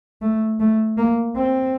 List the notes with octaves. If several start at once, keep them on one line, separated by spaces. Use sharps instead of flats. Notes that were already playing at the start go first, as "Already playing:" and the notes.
A3
A3
A#3
C4